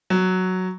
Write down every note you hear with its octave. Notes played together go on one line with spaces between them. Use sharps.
F#3